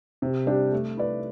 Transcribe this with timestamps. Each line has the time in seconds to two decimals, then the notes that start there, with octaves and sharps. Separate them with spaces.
0.22 C3
0.46 G3 D4 G4
0.72 A3
0.97 E4 B4 D5